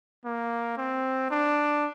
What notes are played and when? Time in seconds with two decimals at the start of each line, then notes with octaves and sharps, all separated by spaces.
0.25 A#3
0.77 C4
1.31 D4